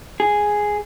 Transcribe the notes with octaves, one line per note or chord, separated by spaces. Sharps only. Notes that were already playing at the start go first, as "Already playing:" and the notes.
G#4